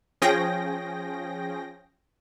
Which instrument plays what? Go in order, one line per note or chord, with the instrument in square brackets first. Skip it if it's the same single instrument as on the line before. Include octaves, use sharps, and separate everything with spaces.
[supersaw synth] F3 C#4 G#4 G5 A#6